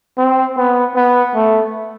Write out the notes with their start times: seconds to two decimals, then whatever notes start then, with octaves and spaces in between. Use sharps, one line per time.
0.18 C4
0.57 B3
0.95 B3
1.35 A3